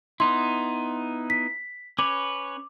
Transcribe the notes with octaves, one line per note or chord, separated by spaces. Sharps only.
B3 D#4 E4 C6
B6
C#4 B4 C#5 D6